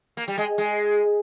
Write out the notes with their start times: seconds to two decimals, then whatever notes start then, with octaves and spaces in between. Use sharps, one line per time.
0.17 A#3
0.28 G3
0.38 G#3
0.58 G#3